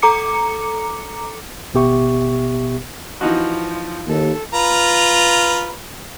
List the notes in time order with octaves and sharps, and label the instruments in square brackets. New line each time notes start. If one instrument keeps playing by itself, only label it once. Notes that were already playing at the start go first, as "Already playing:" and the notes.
[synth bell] A4 A#5 D6 C#7
[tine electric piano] G#1 B2 B3 G4 E5 C#6
[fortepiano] E3 D#4 F#4 [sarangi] F3
[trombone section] D#2 [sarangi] A4
[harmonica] F4 B4 A#5